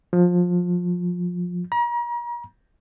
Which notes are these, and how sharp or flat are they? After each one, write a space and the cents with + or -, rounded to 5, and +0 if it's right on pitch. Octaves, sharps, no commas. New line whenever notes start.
F3 +20
A#5 +40